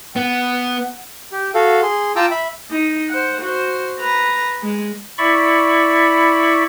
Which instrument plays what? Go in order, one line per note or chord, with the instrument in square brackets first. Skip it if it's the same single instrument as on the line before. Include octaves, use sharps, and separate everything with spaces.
[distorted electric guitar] B3 [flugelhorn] F#5
[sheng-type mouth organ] G4
F#4 A4 F5
G#4 C6
F4 G5 A5 A#5 D6 E6
E5 B5
[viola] D#4
C5 F#5
F#4 C5
B4 A#5
G#3
[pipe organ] E4 D5 B5 C#6